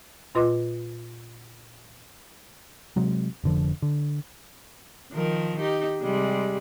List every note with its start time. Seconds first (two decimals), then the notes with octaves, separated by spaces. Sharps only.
0.35 A#2 F4 B4 D#5 C6 D6
2.96 C3 F#3 G#3
3.44 F1 D3 F3
3.82 D3
5.12 D#3 F3 A#4
5.60 D#4 G4
6.01 C3 G3 G#3